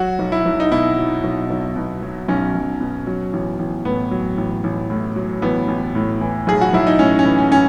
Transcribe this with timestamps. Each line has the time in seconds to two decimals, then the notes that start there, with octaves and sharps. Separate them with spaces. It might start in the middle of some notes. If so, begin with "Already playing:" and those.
Already playing: F#3 F#4
0.19 B1
0.32 E4
0.45 B1
0.60 D#4
0.72 B2 E4
0.98 F#3
1.24 B1
1.50 B1
1.76 B2
2.02 F#3
2.28 B1 C#4
2.55 B1
2.81 B2
3.07 F#3
3.33 A1
3.59 A1
3.85 A2 B3
4.11 F#3
4.38 A1
4.64 A1
4.90 A2
5.16 F#3
5.42 A1 B3
5.68 A1
5.95 A2
6.21 E3
6.47 B1 G#4
6.61 F#4
6.73 B1 E4
6.87 D#4
6.99 A2 C#4
7.19 C#4
7.25 E3
7.39 C#4
7.52 C#4